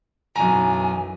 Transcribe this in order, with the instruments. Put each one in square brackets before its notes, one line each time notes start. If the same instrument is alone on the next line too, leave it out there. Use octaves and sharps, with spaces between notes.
[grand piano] B1 A#5 [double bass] F#2 E3 [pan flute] G#5